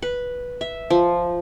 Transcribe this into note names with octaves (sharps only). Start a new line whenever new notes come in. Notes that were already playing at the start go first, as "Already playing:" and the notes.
B4
E5
F3